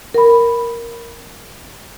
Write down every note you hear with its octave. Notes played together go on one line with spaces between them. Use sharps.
A#4 B5